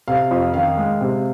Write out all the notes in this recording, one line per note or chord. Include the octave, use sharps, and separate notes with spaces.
C3 F5
F2
D#3 F5
G#3
C3